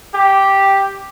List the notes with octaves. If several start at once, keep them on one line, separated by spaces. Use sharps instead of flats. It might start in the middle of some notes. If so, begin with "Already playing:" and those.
G4